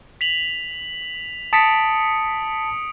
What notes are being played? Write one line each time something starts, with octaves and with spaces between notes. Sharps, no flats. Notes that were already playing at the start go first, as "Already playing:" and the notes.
B6 F7 F#7
A5 D#6 B6 C#7 D7